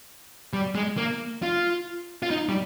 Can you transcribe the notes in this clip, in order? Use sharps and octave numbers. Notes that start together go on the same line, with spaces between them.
G3
G#3
A#3
F4
F4
D#4
G3